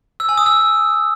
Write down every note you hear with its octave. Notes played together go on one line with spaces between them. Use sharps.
E6
G#5
D#6
E6